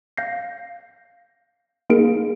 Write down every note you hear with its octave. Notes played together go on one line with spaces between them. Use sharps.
F5 G6 A#6 C7
A#3 D#4 G#4 A#4 D7